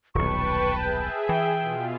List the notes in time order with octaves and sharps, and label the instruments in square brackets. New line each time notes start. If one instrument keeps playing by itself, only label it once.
[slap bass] D#1 B1 [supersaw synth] B4 G5 A5 [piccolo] C#6
[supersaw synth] G#4 E5 [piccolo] G6
[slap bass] E3 [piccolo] G5
[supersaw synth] B2 F4